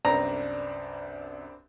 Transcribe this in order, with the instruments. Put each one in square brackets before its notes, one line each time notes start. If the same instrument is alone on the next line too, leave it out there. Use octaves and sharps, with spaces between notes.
[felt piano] C2 F#2 [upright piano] C4 D4 B4 [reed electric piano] D5 [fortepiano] A#5